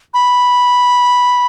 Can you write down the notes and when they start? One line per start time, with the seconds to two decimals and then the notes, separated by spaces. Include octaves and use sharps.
0.14 B5